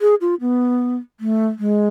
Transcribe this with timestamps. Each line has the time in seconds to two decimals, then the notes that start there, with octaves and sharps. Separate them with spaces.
0.01 G#4
0.21 F4
0.41 B3
1.20 A3
1.59 G#3